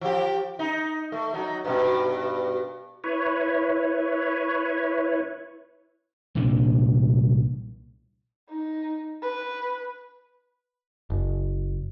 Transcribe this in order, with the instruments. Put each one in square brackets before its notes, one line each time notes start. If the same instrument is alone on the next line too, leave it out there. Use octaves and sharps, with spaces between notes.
[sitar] F3 G4
D#4
A3
F#3 D#4
G2 B2
[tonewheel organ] E4 B4 C#5
[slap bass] C2 A#2 E3 D4
[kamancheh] D#4
B4
[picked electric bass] F#1